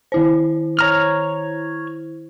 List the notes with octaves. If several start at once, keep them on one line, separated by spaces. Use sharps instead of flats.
D#3 E4 C5
C#5 A#5 F6